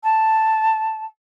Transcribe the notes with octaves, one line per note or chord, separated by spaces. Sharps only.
A5